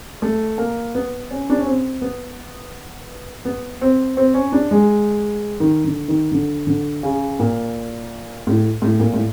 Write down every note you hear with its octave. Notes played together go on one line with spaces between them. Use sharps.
A3
A#3
B3
C#4
D4
C#4
C4
B3
B3
C4
C4
C#4
D4
G#3
D#3
D3
D#3
D3
D3
C#3
A#2
A2
A2
A#2
A2